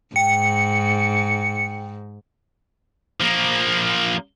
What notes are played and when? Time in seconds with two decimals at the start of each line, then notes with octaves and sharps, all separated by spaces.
0.16 G#2 G5 C#7
3.20 F3 A#3